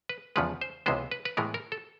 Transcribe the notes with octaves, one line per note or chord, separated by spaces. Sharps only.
B4
E2 C#3 F3 G#3 B4
C5
C#2 C3 E3 G#3 B3 C5
B4
B4
A2 E3 G#3 B3 A#4
A#4
A4